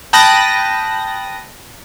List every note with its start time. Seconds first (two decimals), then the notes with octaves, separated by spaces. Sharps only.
0.13 G5 A5 B5 D#6 F#6 A#6